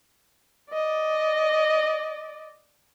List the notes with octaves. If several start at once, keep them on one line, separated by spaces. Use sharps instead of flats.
D5 D#5